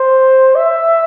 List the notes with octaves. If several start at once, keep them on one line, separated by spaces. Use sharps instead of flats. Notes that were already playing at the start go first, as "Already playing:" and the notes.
Already playing: C5
E5